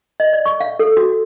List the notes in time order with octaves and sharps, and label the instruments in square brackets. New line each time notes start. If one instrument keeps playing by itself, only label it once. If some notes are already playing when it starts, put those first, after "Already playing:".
[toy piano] D#5
D5
C#6
F5
A4
F#4